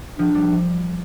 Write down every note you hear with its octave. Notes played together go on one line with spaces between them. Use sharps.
F3 D4
G3